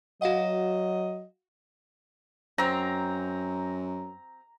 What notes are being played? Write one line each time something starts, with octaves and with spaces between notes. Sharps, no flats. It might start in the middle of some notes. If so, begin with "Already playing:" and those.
F#3 F#4 D#5 F5 F#5
F#2 F#3 C4 A#5